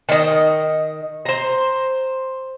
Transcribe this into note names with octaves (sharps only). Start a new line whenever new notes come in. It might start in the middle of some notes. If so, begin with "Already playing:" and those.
D#3 D#5
C5 A#5